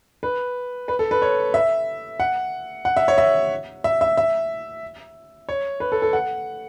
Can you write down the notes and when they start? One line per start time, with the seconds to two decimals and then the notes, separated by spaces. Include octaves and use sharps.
0.23 B4
0.88 B4
0.99 A4
1.11 B4
1.22 C#5
1.54 E5
2.20 F#5
2.85 F#5
2.97 E5
3.08 C#5
3.18 E5
3.84 E5
4.01 E5
4.17 E5
5.49 C#5
5.80 B4
5.92 A4
6.02 A4
6.13 F#5